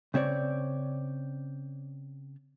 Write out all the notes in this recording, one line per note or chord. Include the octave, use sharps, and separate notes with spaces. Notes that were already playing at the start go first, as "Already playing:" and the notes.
C#3 C4 C#5 D5